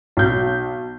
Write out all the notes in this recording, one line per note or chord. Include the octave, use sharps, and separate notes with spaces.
B1 G6